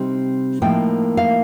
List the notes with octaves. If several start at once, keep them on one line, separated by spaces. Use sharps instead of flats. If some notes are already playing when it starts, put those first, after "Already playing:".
Already playing: C3 G3 C4 D#4
A2 F3 A#3 D#4 G5
F5